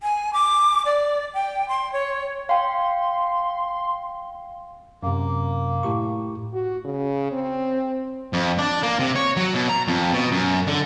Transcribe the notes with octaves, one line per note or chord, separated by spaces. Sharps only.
G#5
D6
D5
G5
C6
C#5
F5 G5 C6
F#2 C3 A#3
A2 G4 C#6
F#4
C#3
C4
F2
D4
A#3
C3
C#5
F#3
B2
A#5
F2
B2
F#2
D3